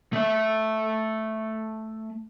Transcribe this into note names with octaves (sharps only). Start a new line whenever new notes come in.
A3 E5